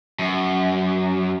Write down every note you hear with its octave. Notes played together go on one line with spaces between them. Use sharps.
F#2